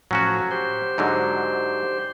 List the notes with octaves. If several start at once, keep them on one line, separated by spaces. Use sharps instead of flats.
A2 F3 F#3 C#4 F#4
G4 C5
G#2 D3 F#3